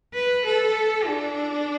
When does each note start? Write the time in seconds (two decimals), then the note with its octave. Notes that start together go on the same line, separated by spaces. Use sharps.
0.15 B4
0.45 A4
1.06 D4